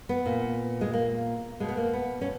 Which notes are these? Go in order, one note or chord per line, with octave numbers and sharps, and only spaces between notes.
B3
A#2
G#3
A#3
B2 G#3
B3
A#3
B3
C#4